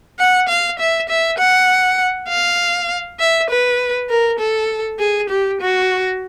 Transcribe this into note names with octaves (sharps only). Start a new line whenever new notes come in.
F#5
F5
E5
E5
F#5
F5
E5
B4
A#4
A4
G#4
G4
F#4